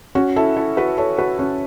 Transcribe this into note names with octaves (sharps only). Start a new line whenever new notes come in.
C#4 F#4
E4 A4
E4 A4
F#4 B4
A4 C#5
F#4 B4
C#4 F#4